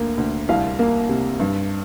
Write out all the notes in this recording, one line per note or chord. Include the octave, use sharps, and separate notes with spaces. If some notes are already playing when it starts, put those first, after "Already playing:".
Already playing: D2 A#3
D2
C2 F5
A#3
C3
G2